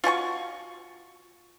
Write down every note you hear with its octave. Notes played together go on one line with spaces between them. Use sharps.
F4 F#4 G#5 C#6